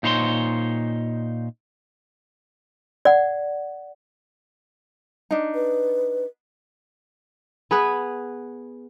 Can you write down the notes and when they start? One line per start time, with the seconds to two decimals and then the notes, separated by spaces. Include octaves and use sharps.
0.03 A#2 D#4 C5 C#5 B5 C6
3.05 D5 F#5
5.31 D4 D#4
5.55 B4
7.71 B3 G#4 B4